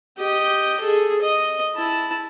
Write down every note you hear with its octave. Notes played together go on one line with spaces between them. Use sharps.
G4 D#5
G#4 A4
D#5
E4 A5